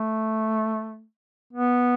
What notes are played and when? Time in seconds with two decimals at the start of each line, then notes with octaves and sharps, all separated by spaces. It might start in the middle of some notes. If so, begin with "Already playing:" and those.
Already playing: A3
1.53 B3